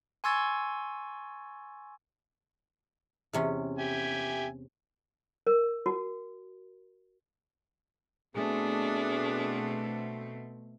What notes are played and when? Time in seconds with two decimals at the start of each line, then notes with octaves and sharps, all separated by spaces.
0.24 G#5 C6 C#6 E6 G#6 A6
3.33 E2 C3 C#4
3.78 G4 E5 G#5
5.47 A#4
5.86 F#4
8.36 B2 A3 C4 D4 G#4